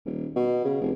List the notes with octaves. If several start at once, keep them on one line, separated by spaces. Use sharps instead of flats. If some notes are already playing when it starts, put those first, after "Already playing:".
D#1
B2
C#3
F1